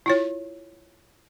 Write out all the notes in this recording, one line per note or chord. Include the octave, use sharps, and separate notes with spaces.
E4 F4 C#5